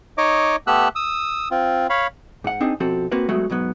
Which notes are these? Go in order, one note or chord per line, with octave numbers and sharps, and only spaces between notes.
D#4 C#5 D#5 D6
A3 B3 G4 E6 F#6
D#6 E6
C4 F4
C#5 F5 B5
G#2 F#5
C4 D4 D#4 G#4
B2 F3 C4 F#4 A4
A#3 C4 F#4 A#4 B4
G2 F#3 G#3 A3 B3 F#4
B1 G#2 F#3 B3